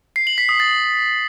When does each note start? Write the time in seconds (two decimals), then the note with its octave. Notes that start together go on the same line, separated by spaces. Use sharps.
0.16 C7
0.27 F#7
0.38 B6
0.49 D#6
0.60 A6